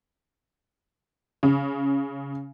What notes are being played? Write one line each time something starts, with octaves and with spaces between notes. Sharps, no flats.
C#3